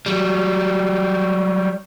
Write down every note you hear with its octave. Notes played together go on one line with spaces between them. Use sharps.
F#3 G3